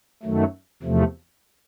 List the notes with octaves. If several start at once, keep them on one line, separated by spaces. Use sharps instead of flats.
F#2 D#3 F#3 A3
E2 C3 F3 A3